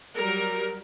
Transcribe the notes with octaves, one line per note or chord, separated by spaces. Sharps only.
F#3 G3 A#4